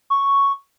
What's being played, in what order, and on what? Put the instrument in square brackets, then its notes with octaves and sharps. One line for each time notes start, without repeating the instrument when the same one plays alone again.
[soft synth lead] C#6